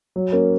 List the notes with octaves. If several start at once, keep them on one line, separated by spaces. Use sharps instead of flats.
F#3
A#3 C#4